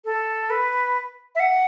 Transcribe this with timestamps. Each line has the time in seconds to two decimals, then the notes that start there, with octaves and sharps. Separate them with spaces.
0.05 A4
0.50 B4
1.35 E5
1.40 F#5